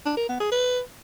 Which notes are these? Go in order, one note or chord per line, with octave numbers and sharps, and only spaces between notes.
D4
A#4
B3
G#4
B4